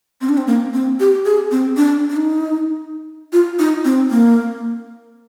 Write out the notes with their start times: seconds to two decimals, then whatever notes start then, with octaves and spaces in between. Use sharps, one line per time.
0.21 C4
0.29 D4
0.37 C4
0.47 A#3
0.74 C4
1.00 G4
1.25 G#4
1.51 C4
1.77 D4
2.10 D4
2.17 D#4
3.33 F4
3.59 D#4
3.85 C4
4.11 A#3